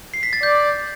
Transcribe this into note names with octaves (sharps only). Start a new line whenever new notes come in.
C7
B6
A6
D5 G6